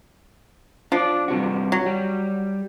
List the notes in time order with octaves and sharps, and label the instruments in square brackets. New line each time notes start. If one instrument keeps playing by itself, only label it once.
[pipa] F3 [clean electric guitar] D4 D5
[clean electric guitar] G2 C3 F#4
[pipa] F#3
[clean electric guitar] G3